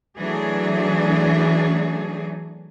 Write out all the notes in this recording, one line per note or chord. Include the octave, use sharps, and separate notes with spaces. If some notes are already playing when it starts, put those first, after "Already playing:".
E3 F#3 A3 D4 G#4